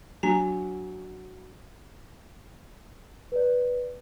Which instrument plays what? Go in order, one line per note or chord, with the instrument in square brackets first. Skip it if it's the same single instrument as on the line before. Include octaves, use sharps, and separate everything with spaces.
[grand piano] F#3 [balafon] D4 G#5
[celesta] B4 D5